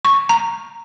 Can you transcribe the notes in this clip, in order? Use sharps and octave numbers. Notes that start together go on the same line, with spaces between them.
C#6
A#5